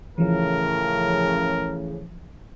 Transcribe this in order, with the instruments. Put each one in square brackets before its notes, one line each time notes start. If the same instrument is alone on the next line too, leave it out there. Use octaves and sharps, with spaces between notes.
[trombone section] A2 C#3 [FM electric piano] E3 F3 [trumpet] A#4